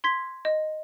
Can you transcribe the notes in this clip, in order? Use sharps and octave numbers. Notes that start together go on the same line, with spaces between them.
C6 G#6 B6
D#5